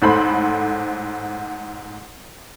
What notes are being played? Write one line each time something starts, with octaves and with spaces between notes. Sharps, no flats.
A1 G#2 A4 C5 B5